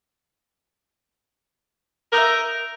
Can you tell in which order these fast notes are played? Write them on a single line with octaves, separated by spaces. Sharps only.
A#4 D#4 E5